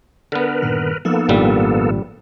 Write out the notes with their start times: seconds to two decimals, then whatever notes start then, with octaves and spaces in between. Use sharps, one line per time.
0.32 D3 B3 A#4 B4
0.62 G2 A#2 D#3
1.05 F3 A#3 B3 D#4 A4
1.29 G#1 G2 A#2 G3